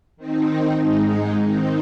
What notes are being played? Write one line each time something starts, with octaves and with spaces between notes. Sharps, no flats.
D#3 C4 D#4
G#2 G#3 D#4
D#3 C4 D#4